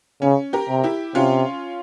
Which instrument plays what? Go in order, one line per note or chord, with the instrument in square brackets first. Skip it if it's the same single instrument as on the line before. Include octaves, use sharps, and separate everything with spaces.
[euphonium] C#3 [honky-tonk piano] C#4
[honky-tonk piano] G4 A#4
[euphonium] C3
[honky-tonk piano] E4 G4
[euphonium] C3 [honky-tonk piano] C#4 F4